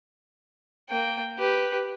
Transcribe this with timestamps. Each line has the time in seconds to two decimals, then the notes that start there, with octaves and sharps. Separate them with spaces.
0.89 A#3 G5
1.38 G4 B4